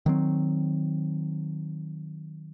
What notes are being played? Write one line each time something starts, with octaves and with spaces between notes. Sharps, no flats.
D#3 F#3 C4